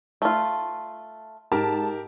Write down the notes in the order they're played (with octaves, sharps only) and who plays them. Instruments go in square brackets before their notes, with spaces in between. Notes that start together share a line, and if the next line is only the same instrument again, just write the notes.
[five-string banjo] A3 F4
[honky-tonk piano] G#2 A5 [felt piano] G4 A#4